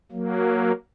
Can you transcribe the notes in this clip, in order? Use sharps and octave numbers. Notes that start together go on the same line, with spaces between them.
F#3 A#3